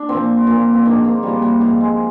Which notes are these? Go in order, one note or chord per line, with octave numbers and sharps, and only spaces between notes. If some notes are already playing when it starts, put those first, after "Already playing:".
Already playing: D4
A#2 F3 C4
A#2 F3
C4
G#2 D#3 D4
A#3
A#2 F3 G3
G3
G#2 F3 G3
G#3